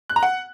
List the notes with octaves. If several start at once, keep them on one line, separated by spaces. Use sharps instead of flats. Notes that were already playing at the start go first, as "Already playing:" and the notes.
F#6
A#5
F#5